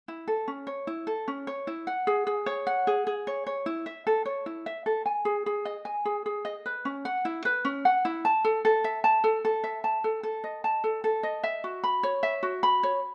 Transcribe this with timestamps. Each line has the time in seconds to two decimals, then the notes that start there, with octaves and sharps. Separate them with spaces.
0.08 E4
0.28 A4
0.48 C#4
0.67 C#5
0.87 E4
1.07 A4
1.28 C#4
1.47 C#5
1.67 E4
1.87 F#5
2.07 G#4
2.27 G#4
2.46 C#5
2.67 F#5
2.87 G#4
3.07 G#4
3.27 C#5
3.47 C#5
3.66 E4
3.86 E5
4.07 A4
4.26 C#5
4.46 E4
4.66 E5
4.86 A4
5.06 G#5
5.25 G#4
5.46 G#4
5.65 D#5
5.85 G#5
6.05 G#4
6.26 G#4
6.45 D#5
6.66 B4
6.85 C#4
7.05 F#5
7.25 E4
7.45 B4
7.65 C#4
7.85 F#5
8.05 E4
8.25 A5
8.45 A4
8.65 A4
8.84 E5
9.04 A5
9.24 A4
9.45 A4
9.64 E5
9.84 A5
10.04 A4
10.23 A4
10.44 D#5
10.64 A5
10.84 A4
11.04 A4
11.23 D#5
11.44 E5
11.64 F#4
11.84 B5
12.03 C#5
12.23 E5
12.43 F#4
12.63 B5
12.83 C#5